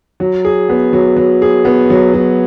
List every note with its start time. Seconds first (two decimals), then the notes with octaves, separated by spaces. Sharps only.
0.20 F#3
0.45 G#4
0.69 B3
0.93 F#3
1.16 F#3
1.42 G#4
1.65 B3
1.90 F#3
2.13 F#3